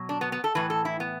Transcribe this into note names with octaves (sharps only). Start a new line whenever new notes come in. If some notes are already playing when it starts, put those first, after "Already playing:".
Already playing: B2 F#3
D4
B3
B3
A4
A2 E3 B4
A4
E4
B3